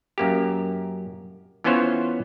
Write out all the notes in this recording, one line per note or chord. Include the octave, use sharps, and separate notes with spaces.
F#2 A#3 G4
E3 B3 C#4 F4 C5 C#5